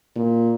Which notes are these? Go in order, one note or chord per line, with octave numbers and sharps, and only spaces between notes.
A#2